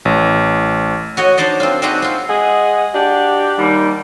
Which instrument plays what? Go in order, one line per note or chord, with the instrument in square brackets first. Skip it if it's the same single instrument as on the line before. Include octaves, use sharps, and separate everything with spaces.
[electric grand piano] A1
[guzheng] F#4 C#5 D#5
D4 D#4 C5 D5 D#5
C4 D4 F4
C4 D4 D#4 F#4 G#4 B4
C4 F4
[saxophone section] G#3 G#4 D#5 F#5
D4 F#4 G4
D#2 G3